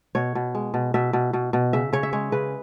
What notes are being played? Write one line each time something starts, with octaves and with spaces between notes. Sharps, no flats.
B2 C#5
B2
G#3
B2
B2 E5
B2
B2
B2
C#3 E5
C#3 C#5
E5
G#3 C#5
C#3 B4